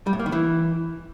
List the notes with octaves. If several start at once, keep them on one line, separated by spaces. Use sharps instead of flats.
G3
A2
A#3
D#3
E3